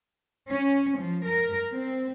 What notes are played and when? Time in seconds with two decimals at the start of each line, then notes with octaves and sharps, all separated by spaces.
0.52 C#4
0.99 F3
1.28 A#4
1.74 C4